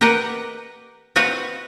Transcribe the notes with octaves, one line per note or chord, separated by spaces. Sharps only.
G4 A#4 B4 D#5 F#5
C4 F#4 B4 D#5 F5 F#5